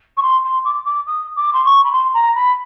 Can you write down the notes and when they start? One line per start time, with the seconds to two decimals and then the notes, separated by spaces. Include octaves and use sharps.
0.17 C#6
0.22 C6
0.44 C6
0.65 D6
0.85 D6
1.07 D#6
1.36 D6
1.53 C6
1.65 C#6
1.84 B5
1.93 C6
2.14 A#5
2.35 B5